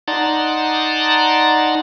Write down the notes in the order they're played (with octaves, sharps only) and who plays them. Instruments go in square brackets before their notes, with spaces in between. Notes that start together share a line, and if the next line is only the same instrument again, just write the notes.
[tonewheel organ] D#4 D5 F#5 A5 A#5 C6